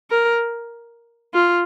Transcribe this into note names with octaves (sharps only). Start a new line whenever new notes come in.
A#4
F4